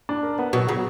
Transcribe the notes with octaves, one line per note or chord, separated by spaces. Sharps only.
D4
A#4
B3
B2 F#3
C#3 F#3